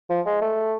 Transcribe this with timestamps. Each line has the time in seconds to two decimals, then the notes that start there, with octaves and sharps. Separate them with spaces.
0.09 F3
0.26 G#3
0.42 A3